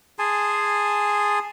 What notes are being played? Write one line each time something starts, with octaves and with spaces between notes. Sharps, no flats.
G#4 G#5 A5 C6